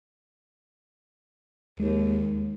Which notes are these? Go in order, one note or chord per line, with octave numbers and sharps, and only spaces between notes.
D#2 G#3